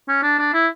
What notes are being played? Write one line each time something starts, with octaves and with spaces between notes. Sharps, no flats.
C#4
D4
D4
E4